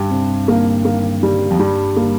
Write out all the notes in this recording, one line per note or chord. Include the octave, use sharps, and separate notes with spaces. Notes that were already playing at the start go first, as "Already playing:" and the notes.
Already playing: G2 G4
C3
A#3
A#3
G3
F2
G2 G3
A#3